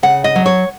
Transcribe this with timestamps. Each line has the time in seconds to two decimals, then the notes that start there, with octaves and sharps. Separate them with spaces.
0.03 C#3 F#5
0.24 D#5
0.36 F#3
0.46 C#5